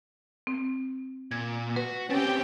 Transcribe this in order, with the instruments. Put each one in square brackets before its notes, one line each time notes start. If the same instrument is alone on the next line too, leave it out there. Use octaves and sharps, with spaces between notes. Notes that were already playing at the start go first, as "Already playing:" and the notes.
[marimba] C4
[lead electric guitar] A#2 [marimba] G#6
[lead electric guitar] F#4 [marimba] B4
[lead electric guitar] C#3 C4 [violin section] C#4 G4 G5 [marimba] B4 G#5 A6